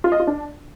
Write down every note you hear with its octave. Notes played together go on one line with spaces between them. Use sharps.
F4
D#5
F4
D4